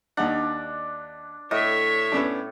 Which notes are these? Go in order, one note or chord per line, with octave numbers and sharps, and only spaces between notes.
D#2 D4 D#4 F#5
A2 C#5 D#5 E5
B3 C#4 D4